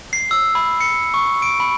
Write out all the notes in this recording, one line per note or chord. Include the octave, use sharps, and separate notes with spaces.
C7
E6
B5
C#7
C#6
D7
B5